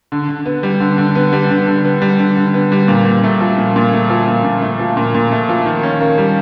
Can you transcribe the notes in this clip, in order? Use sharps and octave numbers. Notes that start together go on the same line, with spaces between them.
D3
D3
B3
G3
D3
D3
B3
G3
D3
D3
B3
G3
D3
D3
B3
G3
A#2
A#2
A3
F3
A#2
A#2
A3
F3
A#2
A#2
A3
F3
A#2
A#2
A3
F3
D#3
C#4
A#3
G3